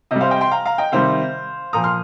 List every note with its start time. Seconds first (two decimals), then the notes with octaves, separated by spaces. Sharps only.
0.11 C3 G3 D#5
0.21 C5 F5
0.31 D#5 G5
0.41 G5 C6
0.51 F5 A#5
0.65 F5 A#5
0.78 D#5 G5
0.92 C3 D#3 G3 C5 F5
1.73 A#2 F3 A#5 D#6
1.84 C6 F6